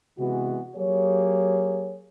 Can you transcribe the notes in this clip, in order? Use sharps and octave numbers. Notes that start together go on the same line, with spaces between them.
C3 E3 G#3 B3 F#4
F#3 A#3 G4 G#4 C#5